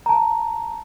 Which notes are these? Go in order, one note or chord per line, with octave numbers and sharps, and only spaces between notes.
A5 A#5